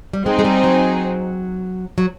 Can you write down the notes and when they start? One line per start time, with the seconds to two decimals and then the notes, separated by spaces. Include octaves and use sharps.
0.13 G3
0.26 G#3 C4 D#4 G#4
0.39 G#3
0.45 G3
0.64 F#3
1.98 F#3